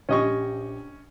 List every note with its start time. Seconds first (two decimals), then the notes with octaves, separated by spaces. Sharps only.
0.09 A#1 C#4 G4 D#5 C#6